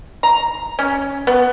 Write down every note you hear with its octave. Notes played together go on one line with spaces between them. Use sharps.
A#5
C#4
B3